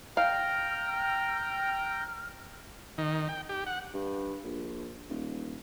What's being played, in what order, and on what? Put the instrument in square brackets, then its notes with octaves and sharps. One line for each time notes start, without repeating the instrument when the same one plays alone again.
[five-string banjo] F5 [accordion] G5 A#5 [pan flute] F6
[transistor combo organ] D#3
G5
G4
F#5
[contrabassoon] G2
A#1
D#1